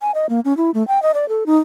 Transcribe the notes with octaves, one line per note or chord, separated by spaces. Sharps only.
G#5
D#5
A#3
C#4
E4
A3
G5
D#5
D5
A4
D#4